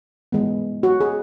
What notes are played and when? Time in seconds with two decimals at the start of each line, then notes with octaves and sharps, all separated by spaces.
0.32 E3 G#3 B3
0.83 F#4
1.01 G#4